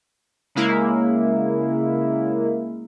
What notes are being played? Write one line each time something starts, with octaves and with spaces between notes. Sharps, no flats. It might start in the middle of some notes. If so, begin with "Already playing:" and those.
C#3 G#3 A#3 E4